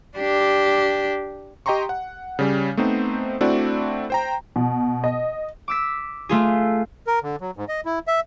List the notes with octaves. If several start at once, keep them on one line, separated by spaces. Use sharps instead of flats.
D4 G4
G4 D#5 G5 A#5 C6 C#6
F#5
C#3 G3 C#4
A3 B3 C4 D#4 C5
A3 C4 D4 E4 F#4 D5
C5 G5 A#5
B2
D#5
D6 E6 B6
A3 F4 G#4
A#4
D3
F#3
G#2
D#5
E4
E5